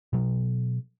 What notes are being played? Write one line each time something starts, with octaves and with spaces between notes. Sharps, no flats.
B2 F#3